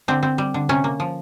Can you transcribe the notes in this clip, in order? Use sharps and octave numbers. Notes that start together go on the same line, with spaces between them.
D3 C4
C4
G3
D3
C3 C#4
A#3
F3